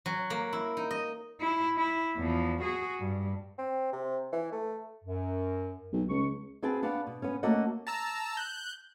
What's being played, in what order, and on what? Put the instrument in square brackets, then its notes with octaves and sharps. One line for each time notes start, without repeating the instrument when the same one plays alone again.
[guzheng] F#3
A#3
E4
D#4
D#5
[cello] E4
E4
E2 F3
F#4 G#4
G2
[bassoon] C4
C3
E3
A3
[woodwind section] F#2
[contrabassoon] B1
[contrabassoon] C#2 [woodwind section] C#6
[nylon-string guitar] C4 F#4 G#4 B4 G5 A5
B3 D4 B4 F5 F#5
B2
B3 C#4
A3 A#3 C#4 F#4 D#5 F#5
[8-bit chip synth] A5 A#5 E6
F#6 G6